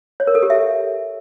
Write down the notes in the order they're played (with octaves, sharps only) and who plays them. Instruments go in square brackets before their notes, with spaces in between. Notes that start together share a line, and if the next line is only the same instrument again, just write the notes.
[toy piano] C#5
A#4
A4
G4
E5